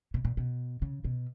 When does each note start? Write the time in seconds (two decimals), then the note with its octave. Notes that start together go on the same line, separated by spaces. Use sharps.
0.14 B2
0.25 A#2
0.37 B2
0.82 C#3
1.05 B2